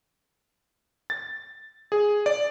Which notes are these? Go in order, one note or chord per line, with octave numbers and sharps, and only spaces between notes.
A6
G#4
D5